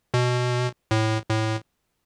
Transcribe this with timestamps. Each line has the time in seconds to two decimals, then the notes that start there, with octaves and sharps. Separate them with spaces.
0.14 B2
0.91 A2
1.29 A2